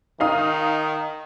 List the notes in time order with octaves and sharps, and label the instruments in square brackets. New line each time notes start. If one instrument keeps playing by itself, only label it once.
[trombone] D#3 [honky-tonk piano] D#4 F5 D#6